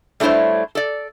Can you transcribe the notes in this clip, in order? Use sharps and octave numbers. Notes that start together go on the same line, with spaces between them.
G3 A3 D4 E4 C5 C#5
A4 D5